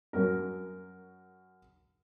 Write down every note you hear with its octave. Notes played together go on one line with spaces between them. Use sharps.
F#2 F#3 A#4